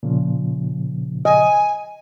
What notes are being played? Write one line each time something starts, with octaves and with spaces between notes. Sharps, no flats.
A#2 C#3 F3
D#5 G#5